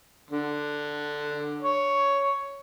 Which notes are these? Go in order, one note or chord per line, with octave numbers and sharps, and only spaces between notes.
D3
C#5